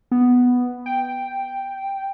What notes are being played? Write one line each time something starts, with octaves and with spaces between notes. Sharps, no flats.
B3
G5